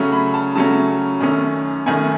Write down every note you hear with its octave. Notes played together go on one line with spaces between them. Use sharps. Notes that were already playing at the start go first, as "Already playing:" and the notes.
Already playing: C#3 F#3 A3 C#4
B5
A5
C#3 F#3 A3 C#4 A5
F#2 D#3 A3 C#4
F#2 D#3 A3 C#4 G#5